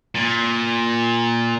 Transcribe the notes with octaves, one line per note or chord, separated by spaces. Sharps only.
A#2